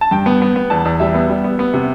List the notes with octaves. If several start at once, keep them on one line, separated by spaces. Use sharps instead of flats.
A5
G2 G5
B3
B3
B3
E2 A5
E2
G3 E5
B3
G3
B3
B3
C3